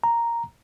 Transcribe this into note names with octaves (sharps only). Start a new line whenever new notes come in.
A#5